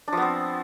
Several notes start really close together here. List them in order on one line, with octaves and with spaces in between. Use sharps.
D4 F3 B3 C4